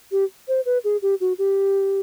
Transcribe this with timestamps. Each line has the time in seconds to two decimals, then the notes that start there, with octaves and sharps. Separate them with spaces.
0.12 G4
0.48 C5
0.66 B4
0.84 G#4
1.02 G4
1.20 F#4
1.38 G4